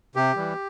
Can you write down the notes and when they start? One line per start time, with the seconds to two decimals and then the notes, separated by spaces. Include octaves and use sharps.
0.15 C3 G4
0.36 E3 G3